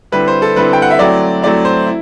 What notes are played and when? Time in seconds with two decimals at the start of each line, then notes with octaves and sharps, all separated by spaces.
0.12 D3 G3 C4 E4 B4
0.28 C5
0.42 A4
0.56 D3 G3 C4 E4 B4
0.73 G5
0.82 F#5
0.90 E5
0.99 F#3 A3 C4 E4 D5
1.42 F#3 A3 C4 E4 D5
1.65 C5
1.87 E4